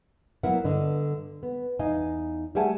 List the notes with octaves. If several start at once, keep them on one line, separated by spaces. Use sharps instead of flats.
F#3 B3 E4 A#4 F5 F#5
G2 D3 D#5
B3
E2 D#4 D#5 F5 G#5
G3 A3 G#4 F#5 G#5 A5